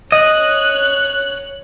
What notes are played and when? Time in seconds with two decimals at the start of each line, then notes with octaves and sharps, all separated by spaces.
0.12 C#5 D#5 F#6